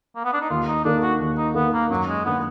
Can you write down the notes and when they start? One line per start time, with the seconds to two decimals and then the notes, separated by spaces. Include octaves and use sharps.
0.16 A#3
0.24 B3
0.33 D4
0.41 D#4
0.50 D#2 F4
0.68 D#4
0.85 D#3 A#3 D4
1.02 F#4
1.20 D#2
1.37 D#4
1.55 D#3 A#3 B3
1.73 A#3
1.90 F#2 F#3
2.08 G#3
2.25 D#3 A#3 B3 D4